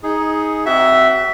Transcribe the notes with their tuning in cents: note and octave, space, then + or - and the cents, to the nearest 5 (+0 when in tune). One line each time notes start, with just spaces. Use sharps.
D#4 +15 G#4 +0
C4 +0 F#4 +30 E5 +0